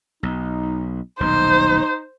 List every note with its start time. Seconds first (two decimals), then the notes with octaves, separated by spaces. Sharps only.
0.23 B1 D#4
1.20 D#1 B1 B2 D#4 C5